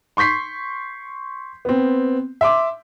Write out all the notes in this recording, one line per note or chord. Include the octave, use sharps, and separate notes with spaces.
C6 C#6 G6 B6 C7
B3 C4
E5 C6 D6